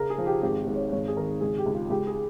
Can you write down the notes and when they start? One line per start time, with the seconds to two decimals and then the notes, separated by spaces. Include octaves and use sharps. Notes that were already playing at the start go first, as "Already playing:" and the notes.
Already playing: C#3 A#4
0.10 G#4
0.18 F3
0.26 G4
0.42 G#1 G4
0.59 G4
0.67 G#2
0.75 C#5
0.92 G#1 C#5
1.08 G#4
1.16 D#3 A#4
1.41 C#2 G#4
1.58 G4
1.66 C#2
1.74 F4
1.90 C#2 G4
2.07 G#4